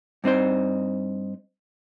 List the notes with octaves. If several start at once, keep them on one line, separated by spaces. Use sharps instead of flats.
G2 C4 D#4 C5